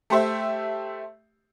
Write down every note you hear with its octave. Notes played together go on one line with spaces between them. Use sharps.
A3 G4 C5 E5